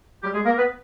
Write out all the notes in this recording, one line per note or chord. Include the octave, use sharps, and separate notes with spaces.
G3 G4
G#3 G#4
A#3 A#4
B3 B4